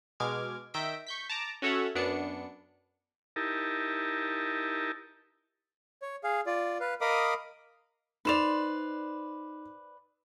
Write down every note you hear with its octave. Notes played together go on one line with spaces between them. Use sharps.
B2 G#3 D6 F6 G#6
D#3 E5 G6 A#6 B6 D7
C#6 G6 B6
A5 A#5 D6
C#4 F#4 A4 C#5 E5 F#5
F#2 B3 D4 C#7
D#4 E4 G4 A#4 A5
C#5
G#4 F5
F4 D5
B4 F5
A#4 D#5 F5 B5 D6 D#6
D#4 B4 C5 D5 E7 F7